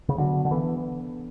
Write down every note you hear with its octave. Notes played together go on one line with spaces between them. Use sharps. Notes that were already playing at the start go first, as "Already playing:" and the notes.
C#3
D3 F#3 B3 F#4
D3
E3 B3 D4 A4